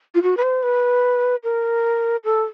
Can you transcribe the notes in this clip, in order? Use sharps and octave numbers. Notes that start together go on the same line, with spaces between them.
F4
F#4
B4
C5
B4
A#4
A4